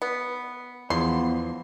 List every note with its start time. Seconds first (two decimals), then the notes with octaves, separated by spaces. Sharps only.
0.02 B3
0.90 E2 F3 B3 C6